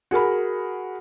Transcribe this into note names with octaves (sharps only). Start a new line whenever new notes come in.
F#4 G#4 A#4 B5